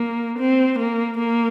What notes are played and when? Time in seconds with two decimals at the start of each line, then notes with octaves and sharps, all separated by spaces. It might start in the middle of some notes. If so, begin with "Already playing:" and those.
Already playing: A#3
0.39 C4
0.79 A#3
1.18 A#3